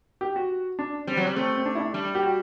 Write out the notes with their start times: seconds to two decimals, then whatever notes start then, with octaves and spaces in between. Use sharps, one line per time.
0.21 G4
0.36 F#4
0.79 D4
1.07 G3 C4
1.17 F#3
1.27 G3
1.36 A3 C4
1.57 C4
1.66 D4
1.75 E4
1.80 D4
1.94 G3
2.15 G4
2.23 F#4